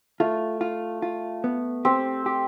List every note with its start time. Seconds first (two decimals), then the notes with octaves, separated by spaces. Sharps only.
0.20 A3 F4
0.61 F4
1.02 F4
1.44 B3
1.85 C4 G4
2.26 G4